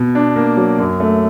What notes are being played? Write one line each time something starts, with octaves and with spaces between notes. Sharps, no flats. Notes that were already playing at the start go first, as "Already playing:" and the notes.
Already playing: B2
D4
A#3
F#3
F#2
A3